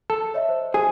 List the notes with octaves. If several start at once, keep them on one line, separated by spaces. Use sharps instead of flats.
A4
C#5 D#5 E5
C5
G#4